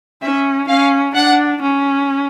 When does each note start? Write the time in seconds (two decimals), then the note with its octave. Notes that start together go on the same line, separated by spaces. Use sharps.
0.22 C#4 E5
0.68 C#4 F5
1.15 D4 F#5
1.62 C#4